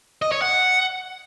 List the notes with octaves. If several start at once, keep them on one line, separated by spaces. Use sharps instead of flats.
D#5
C#5
F#5